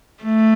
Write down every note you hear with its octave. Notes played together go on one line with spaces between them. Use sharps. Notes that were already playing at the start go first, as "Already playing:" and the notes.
A3